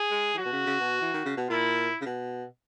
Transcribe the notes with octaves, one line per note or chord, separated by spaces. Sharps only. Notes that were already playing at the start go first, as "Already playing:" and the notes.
Already playing: G#4
G#3
E3
F#3 F#4
B2
C#3
C#3
B2
E3
D#3
C#3
B2
A#2 E4
C#3
B2